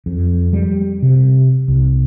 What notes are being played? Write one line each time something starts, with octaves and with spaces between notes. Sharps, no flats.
F2
G3
C3
C2